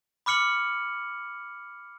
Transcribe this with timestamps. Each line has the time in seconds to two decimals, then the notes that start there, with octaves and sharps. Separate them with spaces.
0.26 B5 D6 F6 C#7 F#7